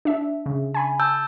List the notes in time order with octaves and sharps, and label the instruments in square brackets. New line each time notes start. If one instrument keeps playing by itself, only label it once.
[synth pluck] D4 E5
C#3
G#5 B5
[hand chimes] A5 E6 G6